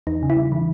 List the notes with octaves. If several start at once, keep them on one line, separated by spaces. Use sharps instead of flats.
E2 D#4
C#3
E4
G3
E3